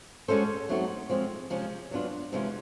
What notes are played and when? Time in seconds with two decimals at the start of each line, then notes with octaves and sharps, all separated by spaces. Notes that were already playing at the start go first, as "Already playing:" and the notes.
0.28 G#3 C#4 F#4 A4 C5
0.69 F#3 A3 C4 D#4 F#4
1.09 F3 G#3 C4
1.50 C3 F3 G#3 C#4
1.91 F#3 B3 D4 F4
2.32 C3 E3 G#3 C#4 F4